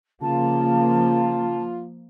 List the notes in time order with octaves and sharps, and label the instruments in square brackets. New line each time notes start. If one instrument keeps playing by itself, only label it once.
[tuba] C#3 [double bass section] F3 A#3 [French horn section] F4 [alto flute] A5